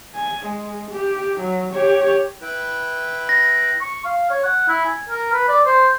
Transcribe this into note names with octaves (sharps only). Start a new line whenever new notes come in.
G#5
G#3
G4
F#3
G4 C#5
E4 B4 G5
A#6
C#6
F5
C#5
F#5
E4
G#5
A#4
B4
D5
C5